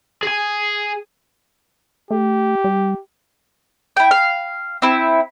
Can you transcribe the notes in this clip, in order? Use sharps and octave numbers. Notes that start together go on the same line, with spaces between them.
G#4 G#5
A3 G4
G3
E4 G5
F5
C4 E4